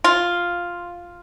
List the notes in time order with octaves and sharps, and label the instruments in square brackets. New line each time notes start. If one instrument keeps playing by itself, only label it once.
[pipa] F4